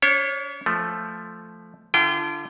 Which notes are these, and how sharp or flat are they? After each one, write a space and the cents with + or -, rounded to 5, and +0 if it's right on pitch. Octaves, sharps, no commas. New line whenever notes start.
C#4 +45 C#5 -25
F3 -5 A3 +0
D3 +0 F4 -40 G5 -10